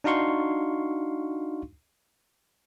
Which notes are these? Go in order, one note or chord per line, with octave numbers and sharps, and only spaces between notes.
D4 D#4 F#4 F5 C6 C#6